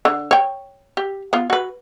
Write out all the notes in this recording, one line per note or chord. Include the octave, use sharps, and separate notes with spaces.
D3
C#5 G5
G4
B3 F4
F#4 B4